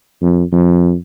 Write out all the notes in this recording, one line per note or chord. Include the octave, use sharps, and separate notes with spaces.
F2
F2